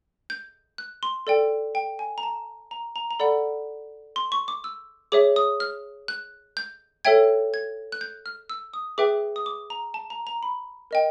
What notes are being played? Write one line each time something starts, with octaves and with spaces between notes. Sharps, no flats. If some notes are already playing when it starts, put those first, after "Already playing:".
G6
F#6
C6
A4 D5 G5
G5
G#5
A#5
A5
A#5
A#5
A#5
A4 D5 F#5 B5
C6
C#6
D6
E6
G#4 C#5 E5 D6
D#6
F6
F#6
G6
A4 C#5 E5 G5 G#6
G#6
F#6
G6
F6
E6
D#6
G#4 B4 E5 G5 D6
D#6
D6
A#5
A5
A#5
A#5
B5
A#4 D#5 G5